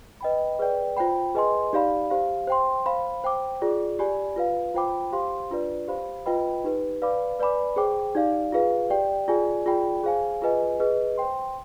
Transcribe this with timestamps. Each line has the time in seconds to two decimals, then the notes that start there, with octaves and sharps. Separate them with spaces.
0.21 B4 D#5 G5 B5
0.59 G#4 B4 D5 G5
0.97 F4 C5 G5 B5
1.35 G#4 B4 D#5 G#5 C6
1.73 D#4 G4 D5 F5 B5
2.10 G4 C5 F5
2.47 C5 G5 C6
2.86 C5 F5 B5
3.24 C5 G5 D6
3.62 F4 G#4 D5
3.99 G4 D5 G#5 B5
4.36 F4 B4 F5
4.74 F4 C5 G5 B5 D6
5.12 G4 C5 F5 C6
5.50 D4 F4 B4 D5
5.88 G4 C5 F5 B5
6.26 F4 B4 D#5 G5 B5
6.64 D#4 G4 B4
7.02 B4 D5 F5 B5 D6
7.40 B4 D5 G#5 B5 D6
7.76 G#4 C5 G5 D6
8.15 D#4 G4 D5 F5
8.52 F4 G#4 B4 F5
8.90 G4 D5 G5
9.28 F4 G#4 D5 G#5
9.66 F4 G#4 D5 G5 B5
10.04 G#4 C5 F5 G#5
10.42 F4 G#4 B4 D#5 G#5
10.79 G#4 B4 D#5
11.18 C5 G5 C6